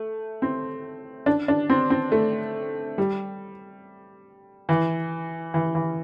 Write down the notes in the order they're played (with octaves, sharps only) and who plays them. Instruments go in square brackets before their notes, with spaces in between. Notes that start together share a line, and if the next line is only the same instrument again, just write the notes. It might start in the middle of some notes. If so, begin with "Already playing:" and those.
Already playing: [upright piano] A3
C4
D4
D4
C4
C4
A3
G3
E3
E3
E3